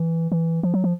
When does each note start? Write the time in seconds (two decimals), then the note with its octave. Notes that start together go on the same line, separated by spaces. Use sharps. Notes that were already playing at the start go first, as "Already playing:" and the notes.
Already playing: E3
0.32 E3
0.63 F3
0.74 F#3
0.84 F3